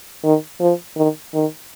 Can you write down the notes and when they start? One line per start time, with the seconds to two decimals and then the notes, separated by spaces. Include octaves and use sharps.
0.24 D#3
0.60 F3
0.97 D#3
1.34 D#3